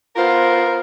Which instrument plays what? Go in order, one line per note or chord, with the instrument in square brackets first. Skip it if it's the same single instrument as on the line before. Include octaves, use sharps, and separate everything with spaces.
[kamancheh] B3 C5 [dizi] F4 [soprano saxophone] A#4